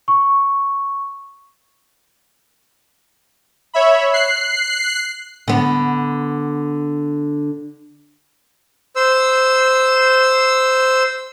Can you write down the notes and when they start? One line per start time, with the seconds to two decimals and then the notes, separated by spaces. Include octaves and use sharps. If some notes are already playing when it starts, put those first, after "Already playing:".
0.08 C#6
3.74 C#5 E5 B5
4.13 F#6 C7
5.48 D3 B3
8.96 C5 E6